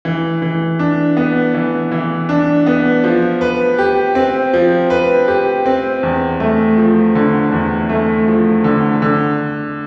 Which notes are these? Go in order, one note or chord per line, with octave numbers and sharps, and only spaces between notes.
E3
E3
D4
B3
E3
E3
D4
B3
F3
B4
G4
C4
F3
B4
G4
C4
E2
A3
F3
D3
E2
A3
F3
D3
D3